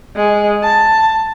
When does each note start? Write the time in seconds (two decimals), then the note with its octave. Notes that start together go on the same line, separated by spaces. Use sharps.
0.16 G#3
0.64 A5